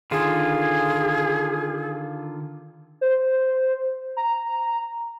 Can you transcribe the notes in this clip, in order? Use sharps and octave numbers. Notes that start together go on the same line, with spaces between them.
D3 D#3 F4 G#4
C5
A#5